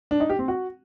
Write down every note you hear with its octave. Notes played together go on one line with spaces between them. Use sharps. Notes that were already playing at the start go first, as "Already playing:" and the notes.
D4
D#4
G4
C4
F#4